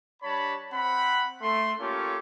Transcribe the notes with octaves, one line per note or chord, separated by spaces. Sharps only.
G3 D4 C#5 A5 B5
C4 F#5 B5
A3 C6
A#3 C#4 F4 G4 A4 C#5